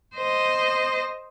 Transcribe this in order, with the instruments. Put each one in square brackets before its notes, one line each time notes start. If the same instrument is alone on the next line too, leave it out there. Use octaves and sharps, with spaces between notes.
[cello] C5 D#5